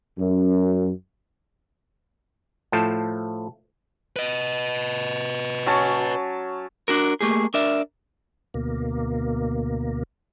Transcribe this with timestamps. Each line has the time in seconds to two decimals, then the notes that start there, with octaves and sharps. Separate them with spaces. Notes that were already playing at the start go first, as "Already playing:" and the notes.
0.18 F#2
2.72 A2 F3 A3 C5 A5
4.16 B4 D#5
5.66 F#3 C#4 A5
6.88 D4 F#4 A#4
7.21 A3 A#3 G4 G#4
7.54 D4 A#4 D5 E5
8.54 D2 B2 A#3